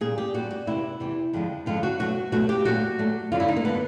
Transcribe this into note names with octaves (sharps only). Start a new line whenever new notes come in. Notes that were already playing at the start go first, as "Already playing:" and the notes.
A#2 G3 G#4
G4
A#2 G3 F#4
F#4
E2 C3 E3 E4
E2 C3 E3
F2 D3 F3 G#3
F2 D3 F3 G#3 F4
F#4
B2 F#3 A3 F#4
B2 F#3 A3 F#4
G4
A#2 F#3 A3 F#4
A#2 F#3 A3
F#2 D3 F#3 F4
E4
D#4
A#3
D3 F#3 B3